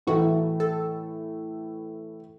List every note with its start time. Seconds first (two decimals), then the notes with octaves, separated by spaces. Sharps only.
0.07 A2 E3 A3 E4 F#4
0.60 A4